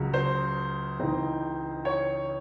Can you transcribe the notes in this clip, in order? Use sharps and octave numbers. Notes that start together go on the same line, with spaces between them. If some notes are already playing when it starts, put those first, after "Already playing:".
Already playing: C#2 C#3 F#3
C5
C#2 C#3 E3 C4 D#4
C#5